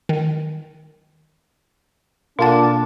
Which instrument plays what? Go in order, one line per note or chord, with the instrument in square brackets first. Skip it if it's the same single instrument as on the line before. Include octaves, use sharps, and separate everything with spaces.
[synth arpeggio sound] D#3
[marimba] B2 F#5 [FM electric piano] A#3 F4 A5 [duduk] D4